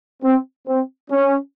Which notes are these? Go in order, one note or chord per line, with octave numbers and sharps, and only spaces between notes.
C4
C4
C#4